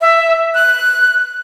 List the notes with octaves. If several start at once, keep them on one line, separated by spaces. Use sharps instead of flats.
E5
F#6